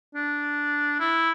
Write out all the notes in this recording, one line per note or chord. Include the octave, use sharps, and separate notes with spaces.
D4
E4